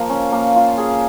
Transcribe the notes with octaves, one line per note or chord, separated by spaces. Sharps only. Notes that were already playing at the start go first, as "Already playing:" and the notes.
Already playing: A#2 F3 A#3
C#4
A#3
F4
G#4